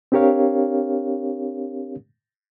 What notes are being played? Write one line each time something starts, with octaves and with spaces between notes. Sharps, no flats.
C4 D4 G4 A#4 C#5 F5